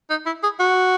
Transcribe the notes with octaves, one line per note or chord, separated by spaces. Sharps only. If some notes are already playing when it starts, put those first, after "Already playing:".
D#4
E4
G#4
F#4